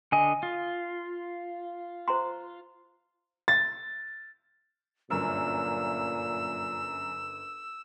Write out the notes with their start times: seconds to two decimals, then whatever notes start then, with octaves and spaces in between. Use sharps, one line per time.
0.12 D3 D#5 G#5
0.43 F4
2.08 C5 A#5 C6
3.48 A6
5.10 G1 F#2 A#2 A#4 E6